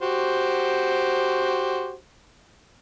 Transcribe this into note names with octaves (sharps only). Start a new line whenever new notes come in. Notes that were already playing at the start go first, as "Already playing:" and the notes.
F#4 G4 C5